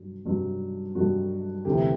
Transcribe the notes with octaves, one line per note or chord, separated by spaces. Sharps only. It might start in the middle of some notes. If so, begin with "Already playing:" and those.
Already playing: G2 F#3
G2 F#3
G2 F#3 F#4
D2 C3 E3 G4